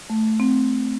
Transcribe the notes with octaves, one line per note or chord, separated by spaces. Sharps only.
A3
C4